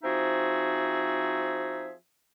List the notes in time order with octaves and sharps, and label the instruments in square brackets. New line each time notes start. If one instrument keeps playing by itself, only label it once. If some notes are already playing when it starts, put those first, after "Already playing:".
[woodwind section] F3 C4 D#4 F#4 G#4 E5